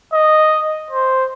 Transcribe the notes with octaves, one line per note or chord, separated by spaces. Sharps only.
D#5
C5